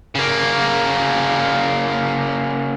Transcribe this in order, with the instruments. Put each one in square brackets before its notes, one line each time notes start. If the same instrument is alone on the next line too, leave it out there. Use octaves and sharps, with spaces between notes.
[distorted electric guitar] C#3 A#3